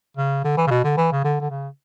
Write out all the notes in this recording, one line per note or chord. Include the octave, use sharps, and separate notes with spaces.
C#3
D3
E3
C#3
B2
D3
E3
C#3
D3
D3
C#3